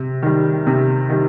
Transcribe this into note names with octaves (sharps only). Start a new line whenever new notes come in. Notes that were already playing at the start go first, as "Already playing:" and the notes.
Already playing: C3
D#3 G3
C3
D#3 G3